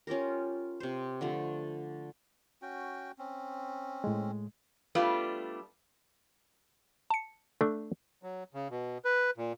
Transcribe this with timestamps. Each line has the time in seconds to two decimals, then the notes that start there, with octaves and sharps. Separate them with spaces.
0.07 C#4 F4 G4 A#4
0.80 C3 C5
1.21 D3 F3 A3
2.62 C#4 F#4 G5
3.18 C4 C#4
4.04 A2 G#3
4.95 G3 A3 B3 D4 F4
7.10 A5 C#7
7.61 A3 D4 A4
8.23 F#3
8.54 C#3
8.71 B2
9.05 B4
9.37 A#2